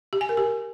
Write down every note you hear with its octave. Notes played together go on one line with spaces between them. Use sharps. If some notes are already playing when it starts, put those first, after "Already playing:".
G4
G#5
A#4
G4